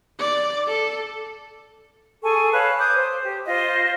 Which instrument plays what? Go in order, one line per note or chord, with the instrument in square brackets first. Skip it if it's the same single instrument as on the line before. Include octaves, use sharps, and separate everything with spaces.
[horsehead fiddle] D5
A4
[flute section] G#4 A4 G#5 C#6
B4 C#5 F5 A5
D6 D#6 G6
C5
G4
F4 C5 D#5